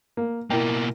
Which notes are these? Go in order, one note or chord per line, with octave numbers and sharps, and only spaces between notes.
A#3
B2 A#3 E4 A#4 G5